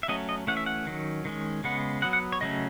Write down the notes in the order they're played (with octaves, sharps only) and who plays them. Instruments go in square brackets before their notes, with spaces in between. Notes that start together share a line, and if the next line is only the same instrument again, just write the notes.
[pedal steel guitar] E5
F#3 A3 C#4 D#5
D#5
E3 A3 C#4 F#5
E5
F#5
D#3 F#3 C#4
D#3 G#3 C#4
C#3 G#3 B3 F#5
F#3 B3 F#5
F#5
C#5
C#3 F#3 A3 C#4 D#5